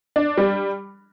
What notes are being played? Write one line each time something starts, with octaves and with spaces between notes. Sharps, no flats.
D4
G3